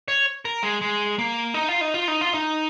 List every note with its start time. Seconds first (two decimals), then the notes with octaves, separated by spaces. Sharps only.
0.08 C#5
0.45 A#4
0.63 G#3
0.82 G#3
1.19 A#3
1.54 D#4
1.69 F4
1.81 D#4
1.94 F4
2.08 D#4
2.21 F4
2.34 D#4